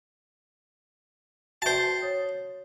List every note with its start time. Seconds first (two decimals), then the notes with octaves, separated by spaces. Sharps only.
1.62 F#4 C5 E5 G5 A5
2.01 C#5 D#6 A6